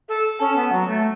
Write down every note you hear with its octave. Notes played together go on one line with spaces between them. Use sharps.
A4
C#4 A4
B3
F#3
A3